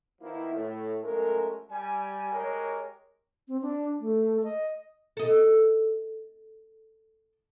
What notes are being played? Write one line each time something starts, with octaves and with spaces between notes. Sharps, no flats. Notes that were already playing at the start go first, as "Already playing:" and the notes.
D#3 F3 A#3 B3 E4
A2
F#2 F3 G#3 A3 A#4
G3 G#5
G#3 G4 A#4 C#5
C4
D4
A3
D#5
A4 D#5